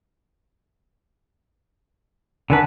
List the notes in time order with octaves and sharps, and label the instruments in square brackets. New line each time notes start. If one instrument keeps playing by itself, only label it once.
[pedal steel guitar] D3 D#3 B4 [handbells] F#5 G#5 A5